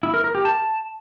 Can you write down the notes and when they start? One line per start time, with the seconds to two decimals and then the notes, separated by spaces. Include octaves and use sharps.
0.03 E4
0.14 A#4
0.24 A#4
0.35 G4
0.45 A5